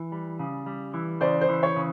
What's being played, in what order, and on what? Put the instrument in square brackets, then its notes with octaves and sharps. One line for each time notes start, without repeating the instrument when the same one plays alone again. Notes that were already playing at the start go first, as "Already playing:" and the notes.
Already playing: [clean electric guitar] E3
G3
C#3
G3
E3
[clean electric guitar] C#3 [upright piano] C5 D5
[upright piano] C5
[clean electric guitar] E3
[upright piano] C#5
[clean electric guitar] C#3